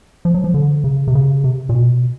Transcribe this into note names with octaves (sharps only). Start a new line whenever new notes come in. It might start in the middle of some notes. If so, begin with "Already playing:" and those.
F3
F#3
F3
D3
C#3
C3
C#3
C3
A#2
B2